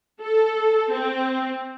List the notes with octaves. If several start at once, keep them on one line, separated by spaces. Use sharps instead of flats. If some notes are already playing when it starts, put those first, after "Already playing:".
A4
C4